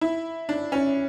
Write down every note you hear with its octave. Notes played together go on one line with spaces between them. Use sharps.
E4
D4
C#4